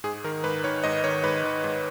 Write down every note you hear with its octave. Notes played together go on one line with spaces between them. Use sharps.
G#2 G#4
D#3 A#4
G#2 B4
D#3 C#5
G#2 D#5
D#3 C#5
G#2 B4
D#3
G#2